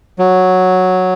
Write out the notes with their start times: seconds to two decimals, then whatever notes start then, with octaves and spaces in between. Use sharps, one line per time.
0.19 F#3